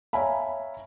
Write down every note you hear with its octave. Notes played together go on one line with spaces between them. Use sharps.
C#5 E5 F5 G#5 A#5 B5